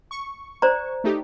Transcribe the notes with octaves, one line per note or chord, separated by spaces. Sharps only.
C#6
C5 D5 A#5
A3 D#4 G4